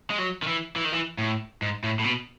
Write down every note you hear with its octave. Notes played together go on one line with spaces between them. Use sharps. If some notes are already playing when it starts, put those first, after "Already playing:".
G#3
F#3
D#3
E3
E3
D#3
E3
A2
G#2
A2
A2
B2